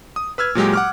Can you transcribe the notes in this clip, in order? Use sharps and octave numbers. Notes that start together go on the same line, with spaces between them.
D#6
B4 E6 F6 G#6
A#2 F#3 G#3 G4
F#5 D6 F6